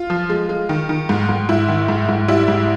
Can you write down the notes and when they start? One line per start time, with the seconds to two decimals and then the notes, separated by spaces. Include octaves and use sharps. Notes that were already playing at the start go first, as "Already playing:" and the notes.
Already playing: F4
0.10 F3
0.30 G#3
0.49 G#3
0.69 D#3
0.89 D#3
1.09 G#2
1.29 G#2
1.49 G#2 E4
1.68 D#3
1.88 G#2
2.09 G#2
2.28 G3 E4
2.48 G#2